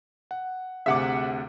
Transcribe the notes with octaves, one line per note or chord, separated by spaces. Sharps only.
F#5
D2 C3 G#4 E5 F#5 D6